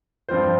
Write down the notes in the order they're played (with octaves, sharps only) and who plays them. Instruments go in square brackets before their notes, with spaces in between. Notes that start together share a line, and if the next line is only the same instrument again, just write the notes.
[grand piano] G2 F3 C4 F4 C5